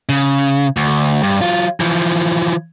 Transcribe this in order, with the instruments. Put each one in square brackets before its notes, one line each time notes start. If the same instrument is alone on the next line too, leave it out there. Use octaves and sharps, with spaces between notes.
[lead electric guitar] C#3
D2
G2
F#3 F4
E3 F3